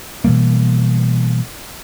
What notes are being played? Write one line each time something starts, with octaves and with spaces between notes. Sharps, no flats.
B2 E3 G3 A#3